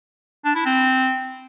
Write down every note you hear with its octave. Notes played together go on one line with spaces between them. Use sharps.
D4
E4
C4